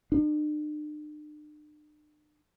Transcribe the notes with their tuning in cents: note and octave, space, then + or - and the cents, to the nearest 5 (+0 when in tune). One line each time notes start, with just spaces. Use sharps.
D4 +45